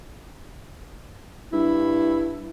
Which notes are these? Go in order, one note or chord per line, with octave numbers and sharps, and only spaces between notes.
G2 E4